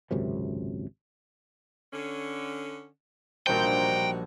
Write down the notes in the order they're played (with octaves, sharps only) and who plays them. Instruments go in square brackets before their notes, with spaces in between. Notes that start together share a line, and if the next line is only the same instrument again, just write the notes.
[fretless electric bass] G#1 C#2 F#2 C3
[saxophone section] D3 C#4
[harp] A#1 G3 C5 [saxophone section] D#4 F#4 [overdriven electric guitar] G5